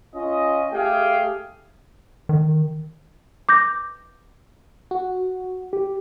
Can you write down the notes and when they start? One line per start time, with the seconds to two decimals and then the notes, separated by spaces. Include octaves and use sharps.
0.16 C#4 F4 D#5
0.73 A3 G4 G#4 F5 G5
2.29 D#3
3.49 D6 G6 A#6
4.91 F#4
5.73 G4